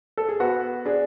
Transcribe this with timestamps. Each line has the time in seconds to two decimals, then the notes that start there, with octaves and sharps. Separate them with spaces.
0.17 A4
0.29 G#4
0.40 B3 F#4
0.86 D4 G#4